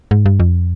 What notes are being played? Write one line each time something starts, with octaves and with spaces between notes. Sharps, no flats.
G#2
G2
F2